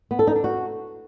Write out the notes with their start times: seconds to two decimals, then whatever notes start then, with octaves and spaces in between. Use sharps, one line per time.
0.11 B3
0.19 A4
0.27 D#4
0.36 D4
0.44 F#4